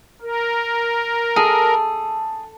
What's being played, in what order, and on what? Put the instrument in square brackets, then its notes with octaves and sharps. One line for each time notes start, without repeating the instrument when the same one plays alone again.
[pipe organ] A#4
[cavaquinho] G#4 [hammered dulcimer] A4